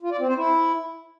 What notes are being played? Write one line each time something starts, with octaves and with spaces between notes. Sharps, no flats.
F4
D5
C4
C5
E4